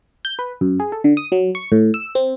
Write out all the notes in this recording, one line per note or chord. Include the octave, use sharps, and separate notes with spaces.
G6
B4
F#2
G#4
A4
D3
D#6
F#3
C#6
A2
E6
C4